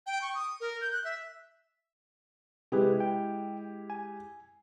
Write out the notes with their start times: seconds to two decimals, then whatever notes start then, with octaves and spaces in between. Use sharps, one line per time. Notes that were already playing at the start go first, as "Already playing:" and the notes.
0.07 G5
0.22 C#6
0.35 D#6
0.61 A#4
0.81 G6
0.92 F#6
1.05 E5
2.72 C3 G#3 E4 G4 G#4 B4
3.00 G5
3.90 G#5